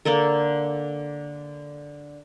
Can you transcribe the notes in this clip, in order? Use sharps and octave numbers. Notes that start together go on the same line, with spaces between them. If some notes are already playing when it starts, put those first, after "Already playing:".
D3 A#3 A4 A#4